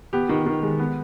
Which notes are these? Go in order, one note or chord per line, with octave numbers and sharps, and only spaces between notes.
B3 G4
D#3
D#3
G#3
B3